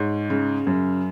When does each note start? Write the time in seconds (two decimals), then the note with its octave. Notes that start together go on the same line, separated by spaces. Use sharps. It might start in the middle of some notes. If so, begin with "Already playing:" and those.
Already playing: G#2 C#5
0.30 C#3
0.67 F#2